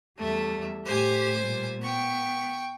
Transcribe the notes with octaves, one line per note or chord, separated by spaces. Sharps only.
E2 G3 A3 E5
A2 G4 C5 G#5
A#2 G3
B3 G5 C#6